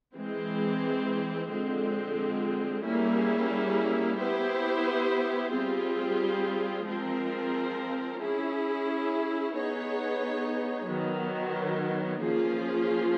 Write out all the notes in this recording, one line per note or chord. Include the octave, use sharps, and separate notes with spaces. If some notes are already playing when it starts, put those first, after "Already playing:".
E3 G#3 C4
D3 F3 G#3 C4
G3 A#3 C#4 E4 G#4
B3 E4 G4 C5
G3 C4 F4 G#4
F3 G#3 C4 F4 A#4
C#4 E4 G#4
B3 D#4 G#4 C#5
D#3 F#3 B3
F3 A#3 C#4 F4 G#4